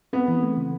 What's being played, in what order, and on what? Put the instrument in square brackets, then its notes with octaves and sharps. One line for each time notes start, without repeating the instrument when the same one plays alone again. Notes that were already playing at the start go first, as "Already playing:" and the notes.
[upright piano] B3 [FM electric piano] C4
[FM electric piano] E3
A3
C#3